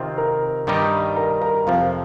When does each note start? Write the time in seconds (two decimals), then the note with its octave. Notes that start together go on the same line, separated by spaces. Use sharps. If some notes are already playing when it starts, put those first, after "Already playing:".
Already playing: C3 D#3 C4 F4
0.18 A#4 A#5
0.67 G2 D#3 G3 D#4 G4
1.16 A#4 A#5
1.41 A#4 A#5
1.67 F2 C3 F3 F4 F5